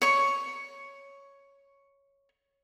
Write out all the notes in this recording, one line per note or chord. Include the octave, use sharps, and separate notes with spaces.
C#5 C#6